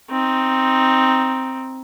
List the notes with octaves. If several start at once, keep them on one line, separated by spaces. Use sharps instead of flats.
C4 D#4